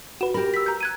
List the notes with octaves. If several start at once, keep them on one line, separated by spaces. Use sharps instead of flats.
F#4 B4 E7
G4 A#4 B5
E6 B6
A#5 G6
F#6 G#6 D#7